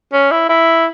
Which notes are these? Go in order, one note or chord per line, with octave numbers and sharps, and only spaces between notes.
C#4
E4
E4